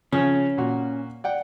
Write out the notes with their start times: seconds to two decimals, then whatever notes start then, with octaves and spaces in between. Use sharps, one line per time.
0.12 C#3 F3 C#4
0.58 A#2 F#4
1.24 D5 F#5 G5